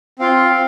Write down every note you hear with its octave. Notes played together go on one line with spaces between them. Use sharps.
C4 F4 F5
C4